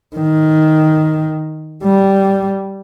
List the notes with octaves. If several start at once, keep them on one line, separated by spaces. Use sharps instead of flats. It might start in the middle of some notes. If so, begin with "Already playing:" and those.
D#3
G3